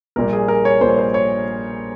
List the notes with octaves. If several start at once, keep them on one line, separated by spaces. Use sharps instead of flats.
A#1 A#2 G3 A#4
G#4
A#4
C#5
A#1 A#2 G3 C5
C#5
C5
C#5